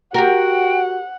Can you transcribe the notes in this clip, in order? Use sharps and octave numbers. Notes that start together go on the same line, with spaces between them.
F#4 G4 A#4 F#5 G5